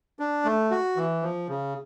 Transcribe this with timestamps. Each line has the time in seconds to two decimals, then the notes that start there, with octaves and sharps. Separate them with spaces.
0.19 D4
0.45 A3
0.71 F#4
0.96 E3
1.22 F3
1.49 C#3